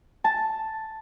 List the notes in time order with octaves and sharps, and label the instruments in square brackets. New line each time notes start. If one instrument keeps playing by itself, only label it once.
[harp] A5